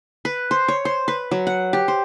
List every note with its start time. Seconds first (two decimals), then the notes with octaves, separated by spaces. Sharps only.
0.25 B4
0.51 C5
0.68 C#5
0.85 C5
1.08 B4
1.31 F#3
1.47 F#5
1.73 G4
1.88 C5